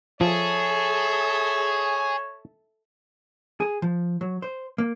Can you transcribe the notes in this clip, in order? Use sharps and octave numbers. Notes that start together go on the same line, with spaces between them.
F3 G#4 A4 C#5 E5
G#4
F3
F#3
C5
A#3